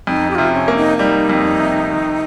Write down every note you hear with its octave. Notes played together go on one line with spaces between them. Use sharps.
F2 D#4
G4
C3 F4
C#4
A#3
D#4
G3 D#4
F2
C3
D#3